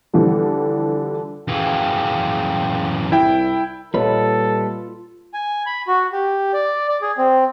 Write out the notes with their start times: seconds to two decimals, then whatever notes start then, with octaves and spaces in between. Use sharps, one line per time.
0.13 D3 E3 F3 G3
1.48 F#2 E3 G#4 F5 G5
3.12 C2 E4 G5
3.94 A#2 G3 F4 A4 B4 C#5 D#5
5.34 G#5
5.66 B5
5.87 F#4
6.13 G4
6.53 D5
6.88 D5
7.02 G#4
7.18 C4